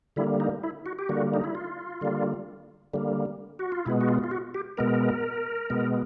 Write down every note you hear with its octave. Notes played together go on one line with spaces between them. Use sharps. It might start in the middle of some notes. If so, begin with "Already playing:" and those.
D3 G3 A#3 E4
D#4
E4
F#4
G4
D3 G3 A#3 F#4
D#4
E4
F4
D3 G3 A#3
D3 G3 A#3
F#4
F4
B2 G#3 B3 E4
F#4
F4
F4
F#4
G4
B2 G#3 B3 A#4
B2 G#3 B3